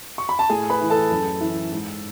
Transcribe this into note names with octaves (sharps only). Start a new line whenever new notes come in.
C#6
B5
A5
A2 G#4 G#5
B4 B5
E3
A4 A5
F#2
E3
G#2